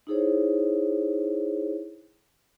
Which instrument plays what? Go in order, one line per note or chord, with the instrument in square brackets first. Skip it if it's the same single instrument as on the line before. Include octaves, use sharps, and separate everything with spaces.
[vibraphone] D#4 E4 G#4 A4 C5 C#5